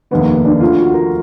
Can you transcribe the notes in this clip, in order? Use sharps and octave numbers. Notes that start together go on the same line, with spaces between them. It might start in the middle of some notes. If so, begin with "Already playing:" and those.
F1 D#2 D#3 B3
A#3
B3
D4
D2 D3 F3 F4
F#4
A#4